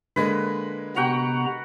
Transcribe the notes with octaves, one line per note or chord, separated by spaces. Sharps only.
D3 G#3 A#3 B4
C3 B3 F#4 F#5 G5 A#5